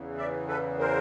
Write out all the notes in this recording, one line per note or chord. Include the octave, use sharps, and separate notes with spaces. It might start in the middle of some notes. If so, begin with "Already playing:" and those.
Already playing: E2 C#3 E3
D5 E5
A4 B4
A#4 C5